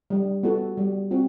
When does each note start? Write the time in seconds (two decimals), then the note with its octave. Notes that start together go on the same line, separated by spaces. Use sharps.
0.10 G3
0.43 B3 F#4 A4
0.77 G3
1.11 C4 F#4